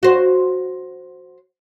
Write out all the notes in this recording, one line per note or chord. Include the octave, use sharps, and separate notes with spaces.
F#4 C5